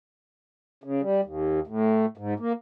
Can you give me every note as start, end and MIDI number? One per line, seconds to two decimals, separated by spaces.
0.84 1.01 49
1.02 1.21 55
1.25 1.60 39
1.67 2.06 45
2.17 2.34 44
2.40 2.53 58